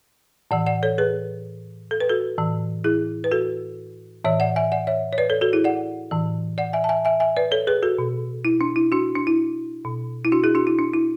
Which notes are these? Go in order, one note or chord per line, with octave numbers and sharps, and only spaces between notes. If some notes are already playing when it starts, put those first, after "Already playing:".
A2 E3 D5 F#5
D5 F#5
A4 C#5
G#4 B4
A4
B4
F#4 A4
A2 E3
E4 G#4
B4
F#4 A4
A2 E3 C#5 E5
D5 F#5
E5 G#5
D5 F#5
C#5 E5
C#5
B4 D5
A4 C#5
F#4 A4
E4 G#4
D5 F#5
A2 E3
D5 F#5
E5 G#5
A5
E5 G#5
E5 G#5
E5 G#5
B4 D5
A4 C#5
G#4 B4
F#4 A4
B2
E4
D4
E4
D4 F#4
D4
E4
B2
E4
D4 F#4
E4 G#4
D4 F#4
E4
D4
E4